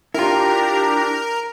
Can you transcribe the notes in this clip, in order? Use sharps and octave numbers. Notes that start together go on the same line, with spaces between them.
D4 E4 F4 G4 A#4 A#5